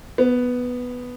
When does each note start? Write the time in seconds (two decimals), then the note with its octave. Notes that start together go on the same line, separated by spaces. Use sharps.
0.18 B3